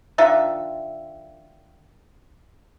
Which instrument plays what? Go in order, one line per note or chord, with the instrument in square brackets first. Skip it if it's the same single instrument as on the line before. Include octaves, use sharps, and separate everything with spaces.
[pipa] D#3 D4 F4 E5